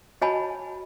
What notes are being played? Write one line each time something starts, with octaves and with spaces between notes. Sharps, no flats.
F#4 C#5 D#5 G#5 A5 B5